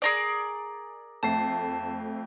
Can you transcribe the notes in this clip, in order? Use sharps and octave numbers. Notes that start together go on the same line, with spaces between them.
G#4 A#4 D5
F2 A3 A5 C7